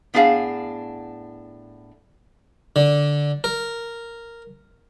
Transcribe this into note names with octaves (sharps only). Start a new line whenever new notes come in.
A2 B3 D4 G#4 F5
D3
A#4